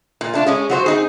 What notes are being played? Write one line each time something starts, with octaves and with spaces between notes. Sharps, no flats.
A#2
A3 D4 F4
G#3 C#4 G#4
F#3 F#4 C5
C4 D#4 G#4